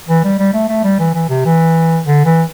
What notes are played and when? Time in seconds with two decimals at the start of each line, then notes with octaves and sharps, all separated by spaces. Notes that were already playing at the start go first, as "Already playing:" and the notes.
0.08 E3
0.24 G3
0.39 G3
0.54 A3
0.69 A3
0.84 G3
0.99 E3
1.15 E3
1.29 C3
1.45 E3
2.06 D3
2.25 E3